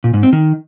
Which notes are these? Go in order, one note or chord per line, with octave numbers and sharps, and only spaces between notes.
A#2
G#2
C4
D#3